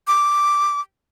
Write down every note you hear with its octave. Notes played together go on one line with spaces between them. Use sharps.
D6